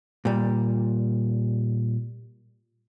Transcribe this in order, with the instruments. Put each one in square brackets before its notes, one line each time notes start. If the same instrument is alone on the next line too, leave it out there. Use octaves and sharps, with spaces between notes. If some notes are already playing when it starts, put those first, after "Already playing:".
[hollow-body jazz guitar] A#2 G3